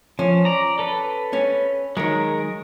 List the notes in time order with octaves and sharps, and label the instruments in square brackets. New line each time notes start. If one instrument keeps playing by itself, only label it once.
[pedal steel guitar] F3 [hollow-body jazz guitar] C#4
[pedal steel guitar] D5 A#5
A4 B4
[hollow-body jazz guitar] C#4
[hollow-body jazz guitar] D#3 F#3 [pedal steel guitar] G#3 A#4